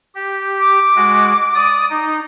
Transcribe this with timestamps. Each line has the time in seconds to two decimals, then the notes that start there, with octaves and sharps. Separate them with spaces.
0.15 G4
0.60 D6
0.96 G#3 F#4
1.55 D5 D#6
1.90 D#4